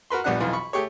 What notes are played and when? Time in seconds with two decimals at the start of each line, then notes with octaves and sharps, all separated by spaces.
0.10 F#4 A#4 B4 C6
0.24 A#1 G3 B3 D4 F#5 F#6
0.40 B1 F2 E3 F4
0.53 B5 C#6
0.73 A3 G4 G#4 C#5